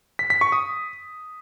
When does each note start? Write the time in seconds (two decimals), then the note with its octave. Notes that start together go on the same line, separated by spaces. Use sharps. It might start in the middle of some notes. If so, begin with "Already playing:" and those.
0.19 B6
0.30 B6
0.41 C#6
0.52 D#6